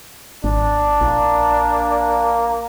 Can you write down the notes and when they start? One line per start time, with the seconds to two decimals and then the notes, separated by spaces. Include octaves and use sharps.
0.44 G#1 D4
1.01 A#1 A#3